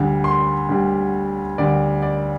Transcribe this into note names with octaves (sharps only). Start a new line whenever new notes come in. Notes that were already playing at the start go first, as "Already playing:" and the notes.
Already playing: D2 D3 G3
C6
D2 D3 G3
D2 D3 G3 D5
D5